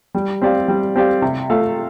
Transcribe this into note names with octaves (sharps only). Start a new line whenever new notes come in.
G3
C4 G4 D5 F5
G3
C4 G4 D5 F5
C3
A3 F4 A4 F5